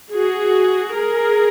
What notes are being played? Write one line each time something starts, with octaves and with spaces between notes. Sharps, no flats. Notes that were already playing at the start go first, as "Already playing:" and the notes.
F#4 G#4
G#4 A#4